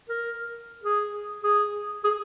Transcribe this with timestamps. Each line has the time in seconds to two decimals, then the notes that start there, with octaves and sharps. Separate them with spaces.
0.09 A#4
0.83 G#4
1.43 G#4
2.04 G#4